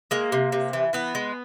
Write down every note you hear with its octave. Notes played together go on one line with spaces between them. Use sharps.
G#3 A#3
C3
C3
E3
E3 B3
G#3